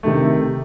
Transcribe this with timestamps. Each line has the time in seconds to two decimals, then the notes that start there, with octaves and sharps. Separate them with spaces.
0.03 C3 D#3 A3